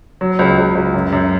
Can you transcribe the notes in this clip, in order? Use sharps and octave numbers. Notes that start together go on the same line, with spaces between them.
F#3
C#2
C#2
C#2
F#2
F#2